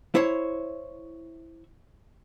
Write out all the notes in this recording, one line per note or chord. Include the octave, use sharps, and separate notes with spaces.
E4 C5 C#5